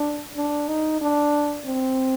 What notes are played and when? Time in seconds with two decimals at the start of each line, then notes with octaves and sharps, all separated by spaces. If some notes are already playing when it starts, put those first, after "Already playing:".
Already playing: D4
0.36 D4
0.68 D#4
1.01 D4
1.65 C4